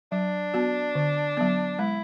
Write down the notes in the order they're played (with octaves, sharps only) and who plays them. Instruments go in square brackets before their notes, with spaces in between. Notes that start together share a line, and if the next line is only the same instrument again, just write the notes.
[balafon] F#3 [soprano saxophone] D4
[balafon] B3 F#4
D3
F#3 B3
[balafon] G#3 [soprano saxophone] E4